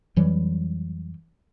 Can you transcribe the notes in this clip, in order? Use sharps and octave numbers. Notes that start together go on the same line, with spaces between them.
F2 E3 F#3 G3